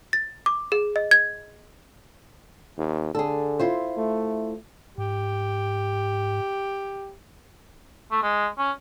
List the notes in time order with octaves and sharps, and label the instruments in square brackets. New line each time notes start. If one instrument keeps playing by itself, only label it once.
[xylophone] A6
D6
G#4
D#5
G#6
[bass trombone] D#2
[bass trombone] D3 [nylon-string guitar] G#4 A4
[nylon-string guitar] E4 F4 C5
[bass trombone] A3
[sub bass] G#2 [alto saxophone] G4
[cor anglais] A3
G#3
C#4